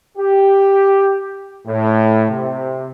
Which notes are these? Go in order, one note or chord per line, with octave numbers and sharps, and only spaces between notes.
G4
A2
C3